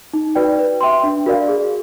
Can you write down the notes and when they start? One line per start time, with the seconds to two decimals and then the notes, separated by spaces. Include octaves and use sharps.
0.13 D#4
0.35 F#4 B4 D5 G5
0.59 B4
0.81 E5 G5 C6
1.04 D4
1.26 F#4 A#4 D5 F5
1.48 G#4